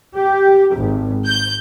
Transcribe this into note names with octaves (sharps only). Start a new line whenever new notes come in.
G4
G#1
G6